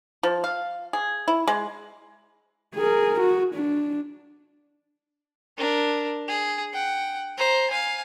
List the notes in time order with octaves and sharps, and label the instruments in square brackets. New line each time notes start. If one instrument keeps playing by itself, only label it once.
[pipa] F3
F5
G#4
E4
G#3
[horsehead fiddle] G#4 A#4
F#4
D4
[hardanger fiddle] D4 A#4
G#4
F#5 G5
C5 A#5
F5 G#5